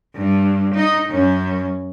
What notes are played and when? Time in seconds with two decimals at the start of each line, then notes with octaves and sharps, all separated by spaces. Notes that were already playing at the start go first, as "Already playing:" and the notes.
0.16 G2
0.75 D#4 D#5
1.09 F#2 C#4